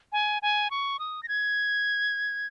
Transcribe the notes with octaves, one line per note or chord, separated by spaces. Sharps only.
G#5
G#5
C#6
D#6
A#6
G#6